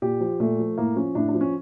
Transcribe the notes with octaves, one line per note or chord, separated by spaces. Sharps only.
A#2 G4
F3
A#2 A3
F3
A2 A#3
F3 C#4
A2 D4
D4
F3
C#4